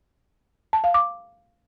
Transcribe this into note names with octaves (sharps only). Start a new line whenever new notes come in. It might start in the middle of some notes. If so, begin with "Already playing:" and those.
A5
F5
D6